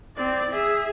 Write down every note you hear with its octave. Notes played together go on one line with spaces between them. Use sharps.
C4 D5
G#4 E5